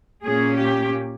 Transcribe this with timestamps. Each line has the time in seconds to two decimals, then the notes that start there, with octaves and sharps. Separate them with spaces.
0.23 A#2 A#3 C#4 G#4
0.57 G4